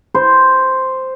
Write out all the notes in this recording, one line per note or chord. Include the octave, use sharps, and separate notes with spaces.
C5